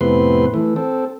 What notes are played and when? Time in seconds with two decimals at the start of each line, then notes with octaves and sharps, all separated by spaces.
0.01 F2 A2 C3 B3 B4 C6
0.54 E3 A3
0.76 C4 A4